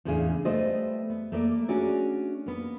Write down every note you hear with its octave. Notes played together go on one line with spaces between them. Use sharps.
E2 A2 C#3 D4 G#4 F5
G3 A3 B3 C5 D5 D#5
B3
A3 A#3 D5
C#4 D4 F#4 G#4 D5
A#3 B3